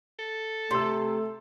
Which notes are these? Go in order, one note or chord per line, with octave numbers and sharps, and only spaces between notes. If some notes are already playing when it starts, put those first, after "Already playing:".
A4
C3 A3 C6 E6